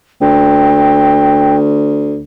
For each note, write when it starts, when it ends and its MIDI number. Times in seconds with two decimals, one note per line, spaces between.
0.21 2.22 38
0.21 1.57 79